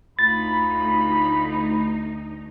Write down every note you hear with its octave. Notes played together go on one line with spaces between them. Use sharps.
D2 D#4 F4 B5 A6